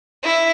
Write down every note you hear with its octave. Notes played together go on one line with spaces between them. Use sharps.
E4